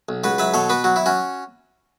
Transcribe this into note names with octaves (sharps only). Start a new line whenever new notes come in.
B1
C#2 F#4 B4
F#3 B4 E5
B2 A4 C#5
B3 F#4 B4
F#3 F#4
E4
C#4 F#4